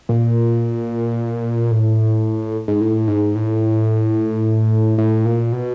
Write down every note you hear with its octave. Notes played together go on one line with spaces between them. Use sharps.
A#2
A2
G#2
A2
G#2
A2
A2
A#2
B2